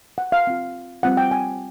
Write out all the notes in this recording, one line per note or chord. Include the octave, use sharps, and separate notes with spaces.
F#5
F5
C4 F4
G3 C4 F4 F#5
G5
G#5